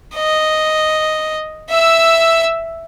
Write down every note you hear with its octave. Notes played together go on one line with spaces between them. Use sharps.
D#5
E5 E6